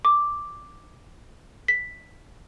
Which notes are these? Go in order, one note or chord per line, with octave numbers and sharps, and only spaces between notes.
D6
B6